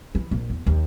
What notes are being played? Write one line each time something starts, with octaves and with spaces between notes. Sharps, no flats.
E3
A#1
E2
D#2